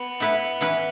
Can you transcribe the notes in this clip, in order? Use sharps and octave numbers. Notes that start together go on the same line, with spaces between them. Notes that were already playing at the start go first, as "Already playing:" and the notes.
Already playing: B3
A2 A3 E4 B4
E3 C#4 E4 B4